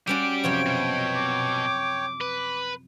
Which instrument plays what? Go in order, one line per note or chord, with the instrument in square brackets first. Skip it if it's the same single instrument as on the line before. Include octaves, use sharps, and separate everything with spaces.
[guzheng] G3 C#4 F#4 [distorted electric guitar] G4 D5 [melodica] D6 [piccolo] D7
[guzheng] F#2 C3 F3 [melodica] C#5 G5
[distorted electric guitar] B2
[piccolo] D6
[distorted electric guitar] B4